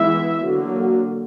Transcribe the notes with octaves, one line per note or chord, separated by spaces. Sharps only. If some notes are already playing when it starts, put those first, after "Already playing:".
Already playing: E3 G#3 B3 E4 E5
D3 F#3 A#3